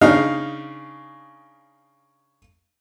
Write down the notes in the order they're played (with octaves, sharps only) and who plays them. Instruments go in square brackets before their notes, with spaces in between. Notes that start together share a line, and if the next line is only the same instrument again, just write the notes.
[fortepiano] C#3 D4 D#4 F5